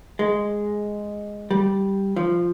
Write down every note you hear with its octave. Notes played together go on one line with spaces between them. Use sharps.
G#3
G3
F3